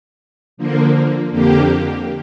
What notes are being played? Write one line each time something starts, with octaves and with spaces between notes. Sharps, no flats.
D3 F3 A#3
F2 D3 A#3 G4